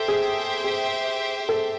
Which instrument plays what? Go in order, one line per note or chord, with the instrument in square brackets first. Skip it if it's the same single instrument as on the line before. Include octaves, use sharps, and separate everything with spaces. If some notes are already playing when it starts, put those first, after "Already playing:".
Already playing: [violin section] G4 C5 E5 G5 [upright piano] A4
[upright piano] G#4
G#4
A4